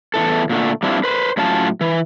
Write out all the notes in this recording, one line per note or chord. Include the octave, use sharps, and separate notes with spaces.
E2 C#3 E3 A4
A#2 D3 A3
G3 C4 D4 E4 F4
B4 C5
A2 F#3 C#4 F4 A5
E3